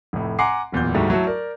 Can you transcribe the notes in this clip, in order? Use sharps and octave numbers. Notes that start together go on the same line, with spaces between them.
F1 A2
F#5 G#5 A#5 C6 D6 C7
D1 E2 A#2 G6
D2 G#2 G3 A3 F#4
F#3 A3 E4 F#4 A4
A#4 D5